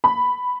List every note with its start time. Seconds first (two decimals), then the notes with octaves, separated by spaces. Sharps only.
0.04 B5